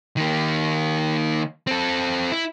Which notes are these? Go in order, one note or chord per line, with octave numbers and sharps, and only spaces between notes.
D#3 A#3
C4 A4
E4